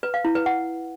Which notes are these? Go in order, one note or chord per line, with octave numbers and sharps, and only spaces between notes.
B4
F5
E4
B4
F#5